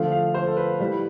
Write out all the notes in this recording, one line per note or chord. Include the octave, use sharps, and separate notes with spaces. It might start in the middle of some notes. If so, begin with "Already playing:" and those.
Already playing: D3 F3 A3 F5
F5
C5
A4
B4
A2 G3 B4